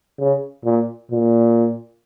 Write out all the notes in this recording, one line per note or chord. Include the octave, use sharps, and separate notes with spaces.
C#3
A#2
A#2